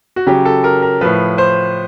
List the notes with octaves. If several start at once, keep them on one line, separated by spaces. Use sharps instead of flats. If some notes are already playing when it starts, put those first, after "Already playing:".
F#4
C#3 F#3 G4
A4
A#4
A#4
A2 F3 B4
C5